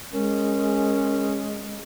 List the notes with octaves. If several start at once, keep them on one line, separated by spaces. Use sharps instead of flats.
G#3 C#4 A#4